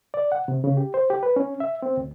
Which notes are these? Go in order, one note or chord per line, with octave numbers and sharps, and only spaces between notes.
D5
F#5
C3
C#3
G4
C5
G4
B4
C#4
E5
C4
D2